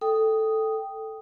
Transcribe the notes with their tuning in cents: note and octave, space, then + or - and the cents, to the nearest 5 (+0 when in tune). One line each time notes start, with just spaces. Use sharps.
A4 +0 G5 +0 D#6 +0